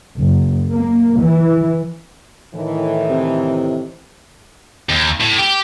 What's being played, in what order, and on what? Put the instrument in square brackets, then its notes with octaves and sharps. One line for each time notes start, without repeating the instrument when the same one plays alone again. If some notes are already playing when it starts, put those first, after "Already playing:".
[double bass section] F#1
A#3
E3
[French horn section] A2 D#3 E3
[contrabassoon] C3
[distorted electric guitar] D#2
A2
G4